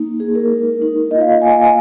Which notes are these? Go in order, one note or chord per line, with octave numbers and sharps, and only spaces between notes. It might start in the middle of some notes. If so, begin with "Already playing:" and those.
Already playing: A#3 D#4
A#3 D#4 G#4
A#4
G#3 D#4
G#3 D#4
A#3 F4 D#5
F5
A#3 F4 G#5
G#5
G#5